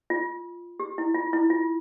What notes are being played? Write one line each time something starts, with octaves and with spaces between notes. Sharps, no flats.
F4
G4
E4
F4
E4
F4